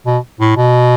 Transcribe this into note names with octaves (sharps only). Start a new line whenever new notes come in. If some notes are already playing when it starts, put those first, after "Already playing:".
B2
A2
B2